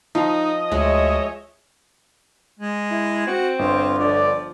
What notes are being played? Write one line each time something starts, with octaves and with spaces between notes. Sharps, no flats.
F3 D#4 D#5
D2 G#3 C#5 E5
G#3
E4
C4 F#4
G1 F4
D3 F3 D5